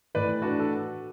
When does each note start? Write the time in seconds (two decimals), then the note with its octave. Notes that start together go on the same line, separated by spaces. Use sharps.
0.14 A2 E3 B4 D5
0.42 D4 F#4
0.59 A4